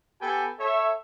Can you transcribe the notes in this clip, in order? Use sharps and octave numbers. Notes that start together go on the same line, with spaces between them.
B3 G4 A4 B4 G5 G#5
A4 C#5 E5